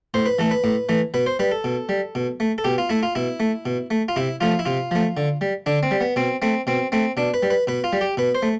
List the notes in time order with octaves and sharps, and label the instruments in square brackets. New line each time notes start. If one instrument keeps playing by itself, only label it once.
[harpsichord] A2 C5
B4
E3 A3 A4
B4
A2
E3 A3
B2 B4
C5
G3 B4
A4
B2
G3
B2
A3
A4
B2 G4
F4
A3 E4
F4
B2 E4
A3
B2
A3
F4
C3 E4
F3 A3 F4
E4
C3 F4
F3 A3
D3
G3
D3 D4
C4
G3
B3
B2 C4
A3 C4
B2 C4
A3 C4
B2 D4
B4
G3
B4
B2 B4
F4
G3
G4
B2 B4
C5
A3